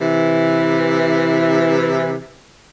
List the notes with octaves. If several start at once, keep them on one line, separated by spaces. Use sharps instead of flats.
C3 E3